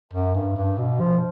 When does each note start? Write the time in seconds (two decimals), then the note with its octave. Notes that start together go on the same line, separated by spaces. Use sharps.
0.13 F#2
0.35 G2
0.56 G2
0.78 B2
1.00 F3